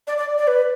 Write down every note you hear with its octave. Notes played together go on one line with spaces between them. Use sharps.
D5
D5
D5
B4